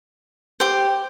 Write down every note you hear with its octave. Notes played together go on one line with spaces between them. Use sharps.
G4 C5